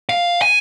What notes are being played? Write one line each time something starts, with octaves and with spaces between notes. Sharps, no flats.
F5
G#5